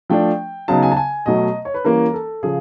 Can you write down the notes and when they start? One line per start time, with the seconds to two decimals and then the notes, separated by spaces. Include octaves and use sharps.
0.10 F3 A3 D4 G5
0.68 C#3 F#3 B3 D#4 A5
0.83 G#5
0.92 A5
0.97 G#5
1.26 B2 F#3 A3 D#5
1.65 C#5
1.74 B4
1.85 E3 G3 A#3 C#4 A#4
2.13 A4
2.43 C#3 F3 G#4